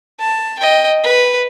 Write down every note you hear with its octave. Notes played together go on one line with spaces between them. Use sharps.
A5
D#5 G5
B4